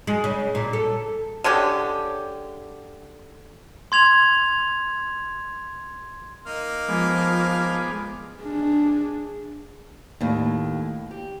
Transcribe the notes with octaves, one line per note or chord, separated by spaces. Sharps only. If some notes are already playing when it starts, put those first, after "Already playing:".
G#3
C#3
A#2
A4
D3 G#3 C#4 G4
C6 G#6 F7
A#3 D#4 F6
F3 G#3 B3 D6
D4 G#4
D#2 A2
G4